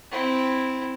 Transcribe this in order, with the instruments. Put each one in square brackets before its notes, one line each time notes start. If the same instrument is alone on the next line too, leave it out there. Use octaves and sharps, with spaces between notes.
[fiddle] C4 E4